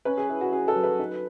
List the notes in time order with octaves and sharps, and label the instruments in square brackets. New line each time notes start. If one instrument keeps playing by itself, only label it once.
[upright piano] C#4 B4
G#4
E4 G#4
F#4
C#4 G#4
A4
F#3
B4
D#4